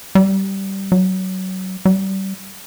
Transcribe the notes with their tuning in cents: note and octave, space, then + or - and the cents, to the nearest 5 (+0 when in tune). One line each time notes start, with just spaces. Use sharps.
G3 -15
F#3 +20
G3 -30